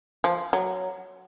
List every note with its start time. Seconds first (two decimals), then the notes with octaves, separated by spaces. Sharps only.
0.24 F3
0.53 F#3